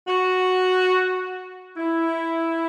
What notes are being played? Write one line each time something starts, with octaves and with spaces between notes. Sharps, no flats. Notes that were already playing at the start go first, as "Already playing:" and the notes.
F#4
E4